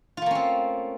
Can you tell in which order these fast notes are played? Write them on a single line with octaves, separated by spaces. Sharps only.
F4 A3 A#3 C#4 C4